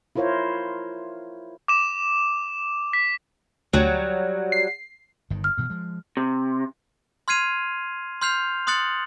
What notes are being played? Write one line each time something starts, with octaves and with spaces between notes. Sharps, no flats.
E4 F4 A#4 C5 C#5 F5
D6 E7
B6
D2 F#3 G3
C7
G1 G2 D#3
F6
G2 B2 E3
F3 G#3
C3
C6 F6 G#6 C7 D#7 F7
C6 F6 G6 C7 F7
C6 D#6 F#6 A6 C#7 F#7